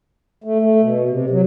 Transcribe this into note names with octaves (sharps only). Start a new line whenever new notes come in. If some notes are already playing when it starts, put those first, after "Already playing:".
A3
A3
B2
C3
F#3